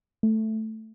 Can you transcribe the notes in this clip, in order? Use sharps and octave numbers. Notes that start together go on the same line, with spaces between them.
A3